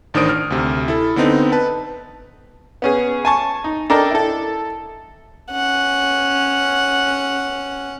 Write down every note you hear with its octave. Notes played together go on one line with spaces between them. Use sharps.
A1 D#3 D4 C5 D#6 D7
F6
D2 C3
E4 A4
D3 B3 C4 D#4
B4 A5
B3 C#4 G#4
G#5 A5 C#6
D#4
D4 A4 A#4 D#5 G5
E4 A4
C#4 F#5